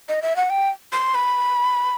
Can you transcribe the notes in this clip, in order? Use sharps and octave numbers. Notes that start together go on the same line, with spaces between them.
D#5
E5
F#5
G5
C6
B5